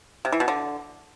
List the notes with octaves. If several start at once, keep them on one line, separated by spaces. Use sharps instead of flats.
C3
E3
B2
D3